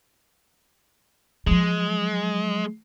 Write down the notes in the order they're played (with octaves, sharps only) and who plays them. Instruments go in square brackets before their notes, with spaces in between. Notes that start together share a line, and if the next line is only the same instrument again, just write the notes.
[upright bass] F3 F#3 [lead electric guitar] G#3